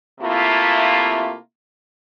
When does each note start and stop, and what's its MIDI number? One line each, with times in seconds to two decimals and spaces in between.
0.20 1.35 48
0.20 1.35 57
0.20 1.35 58
0.20 1.35 64
0.20 1.35 65